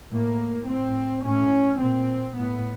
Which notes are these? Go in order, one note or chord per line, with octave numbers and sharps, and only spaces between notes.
A2 A#3
A2 C4
A2 C#4
A#2 C4
A2 B3